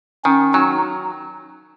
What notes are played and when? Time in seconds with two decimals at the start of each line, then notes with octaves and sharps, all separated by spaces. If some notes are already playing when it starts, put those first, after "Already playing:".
0.25 D#3 C#4
0.53 F#3 D#4